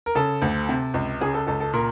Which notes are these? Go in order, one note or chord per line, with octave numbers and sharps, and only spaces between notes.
A#4
C#3 A4
D2
C3
C#2
C#3 G#4
A4
C#2 A4
A4
A#2 A#4